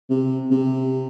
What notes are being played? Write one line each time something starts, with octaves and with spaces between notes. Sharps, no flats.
C3
C3